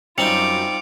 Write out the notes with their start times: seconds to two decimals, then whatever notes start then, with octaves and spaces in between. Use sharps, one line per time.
0.18 F#2 G3 C4 D#4 F4 D6 C#7 F7